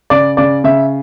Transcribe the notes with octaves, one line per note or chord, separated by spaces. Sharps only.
C#3 D5
C#3 D5
C#3 E5